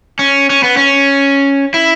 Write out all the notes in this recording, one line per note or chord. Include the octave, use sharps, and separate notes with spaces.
C#4
C#4
B3
C#4
E4